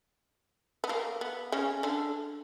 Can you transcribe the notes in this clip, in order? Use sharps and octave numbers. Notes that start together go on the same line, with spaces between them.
B3
A#3
B3
C#3 C#4
D3 D4